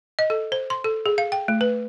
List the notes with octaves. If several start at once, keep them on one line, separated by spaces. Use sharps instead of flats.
D#5
A4
C5
C6
A4
G#4
F5
G5
A3
B4